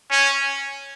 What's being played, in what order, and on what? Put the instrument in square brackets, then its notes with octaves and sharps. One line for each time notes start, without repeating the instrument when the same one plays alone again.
[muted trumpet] C#4